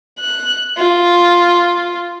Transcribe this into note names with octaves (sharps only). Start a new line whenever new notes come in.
F#6
F4